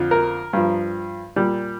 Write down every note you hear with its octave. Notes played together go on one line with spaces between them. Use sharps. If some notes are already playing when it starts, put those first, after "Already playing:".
Already playing: F2 D3 F3
A#4
G2 F3
A#2 G3